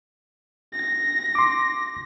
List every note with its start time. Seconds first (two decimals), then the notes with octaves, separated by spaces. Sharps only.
0.74 A#6
1.35 C6 D6